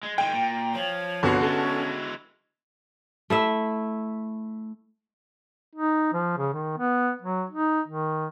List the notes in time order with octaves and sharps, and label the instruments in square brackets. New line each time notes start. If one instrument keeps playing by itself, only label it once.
[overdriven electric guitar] G#3
[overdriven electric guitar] D#3 G#3 [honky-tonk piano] G5
[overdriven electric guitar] A#2
[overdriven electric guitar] F3 [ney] C#5
[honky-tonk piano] G1 C2 C7 [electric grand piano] D3 B3 F#4
[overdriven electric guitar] G#3 E4 [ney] C#4 [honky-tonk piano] A4
[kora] A3 E4 E5
[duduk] D#4
F3
C#3
D#3
B3
F#3
D#4
D#3